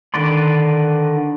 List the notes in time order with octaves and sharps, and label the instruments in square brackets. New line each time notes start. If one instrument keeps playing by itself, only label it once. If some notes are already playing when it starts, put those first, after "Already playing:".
[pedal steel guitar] D3 D#3 B4 D5 C6